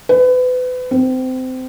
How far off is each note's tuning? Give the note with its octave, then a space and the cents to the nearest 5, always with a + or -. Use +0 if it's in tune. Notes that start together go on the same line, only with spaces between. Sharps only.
B4 +30
C4 -25